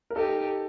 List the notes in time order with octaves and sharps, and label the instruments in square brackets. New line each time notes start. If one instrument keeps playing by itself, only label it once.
[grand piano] A#4
[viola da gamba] D#4 G4 [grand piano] A4